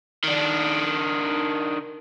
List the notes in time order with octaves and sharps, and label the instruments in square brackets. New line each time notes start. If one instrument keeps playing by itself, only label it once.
[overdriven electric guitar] D#3 D4